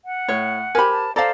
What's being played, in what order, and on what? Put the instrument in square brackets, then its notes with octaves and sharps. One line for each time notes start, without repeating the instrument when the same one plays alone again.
[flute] F#5
[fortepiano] A2 [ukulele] C#5
[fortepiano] G4 G#5 [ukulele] A#4 C5 B5
[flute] A5
[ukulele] A4 F5 [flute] C5 [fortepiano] D5 A5 A#5